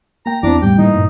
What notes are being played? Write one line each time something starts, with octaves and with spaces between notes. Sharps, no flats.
A#3 G5 A#5
E2 C4 D4 E4 A#5 D6
A2 G3 G5
E3 A#3 D#4
G2 A#2